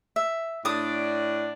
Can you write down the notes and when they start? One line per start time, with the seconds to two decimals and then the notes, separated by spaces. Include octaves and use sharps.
0.16 E5
0.65 A2 D4 D5 D#6